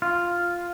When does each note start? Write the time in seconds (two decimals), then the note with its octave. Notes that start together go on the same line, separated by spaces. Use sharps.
0.02 F4